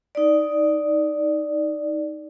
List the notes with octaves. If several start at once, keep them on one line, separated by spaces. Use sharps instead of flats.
D#4 D5